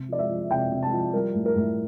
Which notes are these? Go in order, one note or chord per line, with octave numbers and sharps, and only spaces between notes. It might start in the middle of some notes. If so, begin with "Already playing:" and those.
Already playing: C3
F3 D5
E5
F3
C3 G5
C3
A5
F3
G3 A#4
A2
A#4
A2